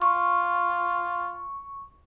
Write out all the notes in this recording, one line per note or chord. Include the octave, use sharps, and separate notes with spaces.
F4 C#6